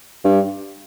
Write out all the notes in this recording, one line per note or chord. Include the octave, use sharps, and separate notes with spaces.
G2